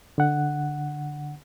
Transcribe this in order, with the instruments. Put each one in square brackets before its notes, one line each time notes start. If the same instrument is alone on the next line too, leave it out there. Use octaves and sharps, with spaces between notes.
[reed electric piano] D3 F#5